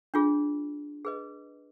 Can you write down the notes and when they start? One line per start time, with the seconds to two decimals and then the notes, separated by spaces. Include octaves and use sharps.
0.14 D4 F4 G#4
1.05 G#4 B4 D#5